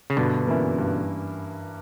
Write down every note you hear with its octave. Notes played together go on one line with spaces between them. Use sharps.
C#3
G2 B2 D3
E3 A#3 C#4 E4
G2